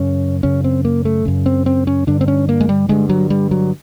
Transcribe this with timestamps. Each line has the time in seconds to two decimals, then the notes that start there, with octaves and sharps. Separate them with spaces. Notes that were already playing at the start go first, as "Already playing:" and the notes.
Already playing: F#2 C#3 C#4
0.43 F#2 C#3 C#4
0.64 C4
0.85 A#3
1.05 A3
1.25 F#2 C#3
1.46 C4
1.66 C4
1.87 C#4
2.07 G2 D3 D4
2.21 C4
2.28 C#4
2.49 A#3
2.61 G#3
2.69 G3
2.89 G2 D3 G#3
3.09 F#3
3.30 G3
3.51 F#3